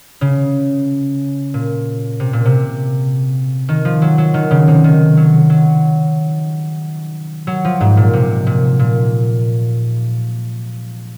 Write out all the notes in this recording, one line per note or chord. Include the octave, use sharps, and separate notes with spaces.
C#3
A#2
C3
A#2
C3
D#3
F3
F#3
F#3
D#3
C#3
C3
D#3
F#3
F#3
F#3
F3
G#2
A#2
C3
A#2
A#2